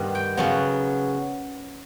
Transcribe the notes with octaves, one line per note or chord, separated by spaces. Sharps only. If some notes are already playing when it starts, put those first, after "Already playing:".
Already playing: G2 D#3 G3 B3
G5
C#3 F#3 B3